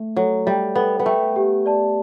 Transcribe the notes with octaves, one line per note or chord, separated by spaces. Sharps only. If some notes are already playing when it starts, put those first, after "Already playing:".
Already playing: A3
F#3 A4
G3 E5 G5
B3 A4
B3
A3 E5 G5
G4
D5 A5